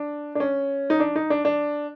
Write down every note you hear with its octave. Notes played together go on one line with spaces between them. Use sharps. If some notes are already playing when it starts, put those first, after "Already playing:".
Already playing: D4
D4
C#4
D#4
D4
D#4
D4
D4